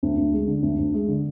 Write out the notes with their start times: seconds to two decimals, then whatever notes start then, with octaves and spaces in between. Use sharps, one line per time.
0.03 D2
0.18 D2
0.33 G#3
0.48 D3
0.63 D2
0.78 D2
0.94 G#3
1.09 D3